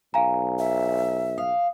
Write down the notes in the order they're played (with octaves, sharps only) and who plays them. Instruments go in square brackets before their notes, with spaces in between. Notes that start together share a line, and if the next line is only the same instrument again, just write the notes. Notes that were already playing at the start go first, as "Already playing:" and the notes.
[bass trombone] B1 [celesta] F5 G#5 A#5
[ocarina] E5
[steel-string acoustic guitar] F5 [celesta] D#6